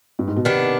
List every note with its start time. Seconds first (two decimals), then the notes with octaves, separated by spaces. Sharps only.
0.19 G2
0.27 G#2
0.36 B2
0.45 C3 D#3 B3 D4